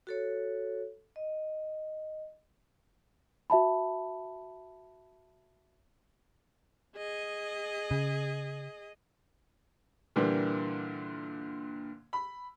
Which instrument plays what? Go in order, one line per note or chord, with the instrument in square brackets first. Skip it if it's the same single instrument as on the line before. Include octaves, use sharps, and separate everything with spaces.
[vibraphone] F#4 A4 C#5
D#5
[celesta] F#4 E5 A5 B5
[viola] G#4 D#5
[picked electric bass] C#3
[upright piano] A#2 D3 E3 G3 A#3
B5